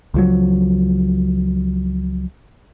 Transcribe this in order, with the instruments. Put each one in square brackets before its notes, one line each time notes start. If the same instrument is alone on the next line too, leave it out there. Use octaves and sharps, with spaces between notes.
[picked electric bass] C#2 F3 F#3